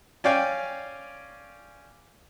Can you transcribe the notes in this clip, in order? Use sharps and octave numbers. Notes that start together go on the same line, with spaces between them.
C#4 D5 F5 G5 G#5